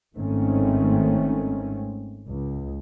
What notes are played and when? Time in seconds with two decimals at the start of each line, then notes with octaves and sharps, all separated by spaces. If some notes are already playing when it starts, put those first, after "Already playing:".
0.15 G#1 G#2 D#3 A3 C4 C#4
2.28 C#2